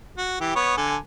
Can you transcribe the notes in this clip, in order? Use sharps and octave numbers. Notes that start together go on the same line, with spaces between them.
F#4
E3 G4
B3 C#5
D3 A4 G#5